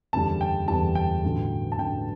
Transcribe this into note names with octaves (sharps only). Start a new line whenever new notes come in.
F#1 E2 D3 G3 A5
G5
F#1 E2 D3 G3 A5
G5
A1 G2 D3 F#3
A5
A1 G2 D3 F#3 G5